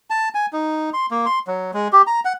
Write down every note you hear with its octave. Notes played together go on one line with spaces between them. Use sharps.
A5
G#5
D#4
C6
A#3
C6
F#3
G#3
G4
A#5
F#5